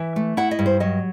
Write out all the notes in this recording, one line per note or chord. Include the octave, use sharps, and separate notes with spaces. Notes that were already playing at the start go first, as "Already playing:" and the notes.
Already playing: E3 E5
A3
E4 F#5
D#5
G2
C5
F#3 D#5